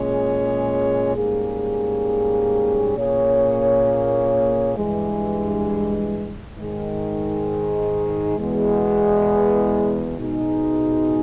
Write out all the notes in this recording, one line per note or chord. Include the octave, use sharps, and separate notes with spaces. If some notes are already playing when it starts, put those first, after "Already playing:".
Already playing: A#2 G#3 C#4 G#4 C#5
G#2 G3 A#3 C#4 G#4
A#2 A#3 C#4 G#4 C#5
G2 E3 G#3
G#2 D#3 G#3
E2 B2 G#3 B3
B2 G#3 D#4 G#4